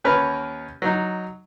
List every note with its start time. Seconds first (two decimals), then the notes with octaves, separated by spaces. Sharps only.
0.04 D#2 C#4 A#4 B4 F6
0.82 F#3 D#4